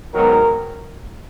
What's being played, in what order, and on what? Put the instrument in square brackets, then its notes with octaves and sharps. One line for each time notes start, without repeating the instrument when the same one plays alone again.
[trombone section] G#2 D#3 F#3 B3 A#4